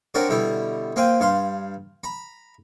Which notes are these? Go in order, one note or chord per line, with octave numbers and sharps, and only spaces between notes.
C4 D4 F#4 A#4 C#5 D5
B2 D3 G3 E4
A#3 C4 F5 G5 G#5
G2 F5 C6
A#5 B5